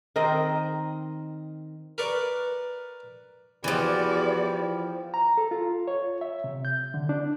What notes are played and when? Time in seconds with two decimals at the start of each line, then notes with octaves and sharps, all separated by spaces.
0.16 D#3 C4 A#4 D#5
1.98 A#4 B4 D5 C#6
3.64 E2 E3 F3 G3 F#4 D5
5.14 A#5
5.37 A4
5.51 F4
5.88 C#5
6.21 E5
6.44 C3
6.65 G6
6.94 D3
7.09 D4